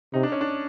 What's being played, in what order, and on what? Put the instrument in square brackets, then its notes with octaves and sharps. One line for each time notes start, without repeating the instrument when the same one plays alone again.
[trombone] C3 [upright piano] D#4
[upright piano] D4
C#4
D4